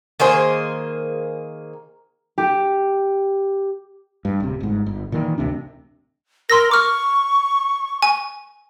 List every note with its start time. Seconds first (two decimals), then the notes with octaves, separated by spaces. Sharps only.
0.20 D#3 A#3 G#4 C5
2.38 G4
4.25 G2
4.40 D1 C3
4.60 G1 G#2
4.86 G1
5.12 A#2 D#3 E3
5.38 A1 D2 C3 D4
6.50 A#4 C6 E6 A#6
6.71 C#6 D6 F6
8.02 G#5